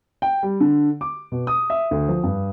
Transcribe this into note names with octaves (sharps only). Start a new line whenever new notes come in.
G5
G3
D3
D6
B2
D#6
E5
D2
F3
G2